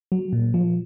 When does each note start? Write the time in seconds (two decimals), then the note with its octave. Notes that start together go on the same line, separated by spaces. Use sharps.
0.12 F#3
0.33 A#2
0.54 F3